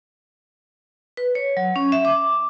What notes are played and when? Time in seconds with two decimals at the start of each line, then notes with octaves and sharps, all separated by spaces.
1.17 B4
1.35 C#5
1.57 F#3
1.76 C#4
1.92 E5
2.05 D6